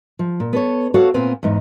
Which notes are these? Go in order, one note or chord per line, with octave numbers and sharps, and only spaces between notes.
F3
A#2
B3 A4 C#5
F#4 A4 C#5 F5 F#5
A#2 B3 C4 F5 G#5
E2 G#2 D#4